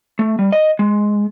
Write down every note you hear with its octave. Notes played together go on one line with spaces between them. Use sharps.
A3
G3
D#5
G#3